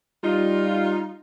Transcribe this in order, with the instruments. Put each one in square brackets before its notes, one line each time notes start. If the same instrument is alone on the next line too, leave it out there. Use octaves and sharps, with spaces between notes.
[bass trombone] G3 [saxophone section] D#4 F4